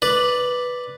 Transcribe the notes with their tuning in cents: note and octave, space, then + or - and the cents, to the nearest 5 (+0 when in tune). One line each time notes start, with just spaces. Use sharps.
B4 +0 D5 +0